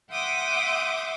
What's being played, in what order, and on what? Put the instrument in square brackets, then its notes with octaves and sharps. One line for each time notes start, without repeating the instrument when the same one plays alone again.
[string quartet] E5 F#5 G5 C6 D6 D#6